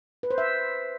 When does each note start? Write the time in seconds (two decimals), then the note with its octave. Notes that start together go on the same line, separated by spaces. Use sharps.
0.23 B4
0.31 C5
0.38 E5